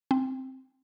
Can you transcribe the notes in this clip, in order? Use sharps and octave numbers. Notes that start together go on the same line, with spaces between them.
C4